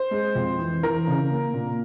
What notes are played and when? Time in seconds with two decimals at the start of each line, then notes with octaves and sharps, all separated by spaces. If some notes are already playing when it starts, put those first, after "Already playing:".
Already playing: C5
0.11 G#3
0.35 F2
0.59 E3
0.83 E3 A#4
1.07 C#3
1.30 A#3
1.54 A#2